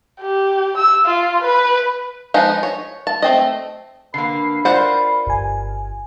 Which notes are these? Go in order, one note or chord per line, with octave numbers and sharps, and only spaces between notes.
G4
E6
F4
B4
F3 G#3 B3 D#4
C#5
A5
A3 C4 D#5
D3 A#3 B4 C7
F4 A#4 C5 D5 F#5
G1 G#5